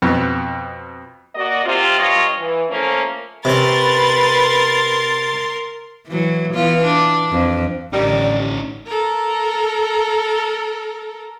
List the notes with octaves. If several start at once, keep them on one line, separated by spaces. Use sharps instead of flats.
F2 B2
A#3 F#4 D5 D#5
C3 F4
G2 F4 C#5 D#5
E3
F3 A3 A#3 C#4
C3 C#4 A#4 B4 C6 A6
E3 F#3
E3 B3 F4
D4
F2
A1 D3 D#3 G3 C#4 D#4 D5
A4 A#4